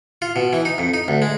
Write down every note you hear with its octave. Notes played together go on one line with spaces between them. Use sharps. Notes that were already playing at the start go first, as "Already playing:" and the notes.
F4
B2
E3
D#4
F2
D#4
D2
G#3